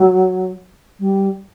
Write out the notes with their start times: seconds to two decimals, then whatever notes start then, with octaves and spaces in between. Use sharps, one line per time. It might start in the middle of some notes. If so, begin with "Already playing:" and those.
Already playing: F#3
1.00 G3